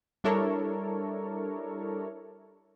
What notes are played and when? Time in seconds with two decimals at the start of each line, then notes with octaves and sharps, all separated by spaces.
0.24 G3 D4 E4 A4 A#4 C#5